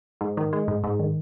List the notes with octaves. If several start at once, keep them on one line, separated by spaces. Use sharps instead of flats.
G#2
D#3
G#3
G#2
G#2
D#3